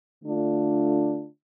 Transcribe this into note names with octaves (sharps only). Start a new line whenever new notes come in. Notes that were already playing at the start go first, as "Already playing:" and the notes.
D3 A3 D4 F4